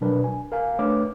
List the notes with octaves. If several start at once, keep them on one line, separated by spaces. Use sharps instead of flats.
B2 F#3 D4 A#4 B4
G#5
A#4 F5 G#5
A3 D4 B4 C#5 D6 F6